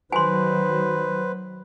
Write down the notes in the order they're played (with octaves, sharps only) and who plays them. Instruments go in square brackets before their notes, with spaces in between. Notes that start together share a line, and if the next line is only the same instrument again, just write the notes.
[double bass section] D#3 F#3 [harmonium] B4 C5 [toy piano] G#5 C6